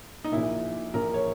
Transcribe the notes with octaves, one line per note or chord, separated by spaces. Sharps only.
D#4
A#1 A#2 E4
A#1 A#2 A#4
C#5